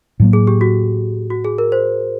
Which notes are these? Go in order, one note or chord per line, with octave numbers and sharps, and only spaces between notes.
A2 F#3 A#3
G#4
G4
F#4
F#4
G#4
A#4
C5